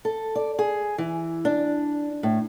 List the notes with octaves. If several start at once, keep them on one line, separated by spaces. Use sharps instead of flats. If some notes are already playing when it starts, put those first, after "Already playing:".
A4
D5
G#4
E3
D4
A2